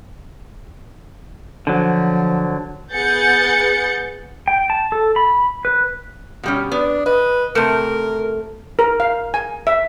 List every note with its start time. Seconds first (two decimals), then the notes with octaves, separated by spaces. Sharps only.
1.67 D3 F3 F#3
2.94 B3 G#4 F#5 G6 A6 C#7
4.48 G5
4.70 A5
4.92 A4
5.16 B5
5.65 B4
6.43 B2 G3 C#4
6.72 B3 D4
7.06 B4 D#5
7.55 C3 A3 A#4
8.79 A#4
9.00 F5
9.34 G#5
9.67 E5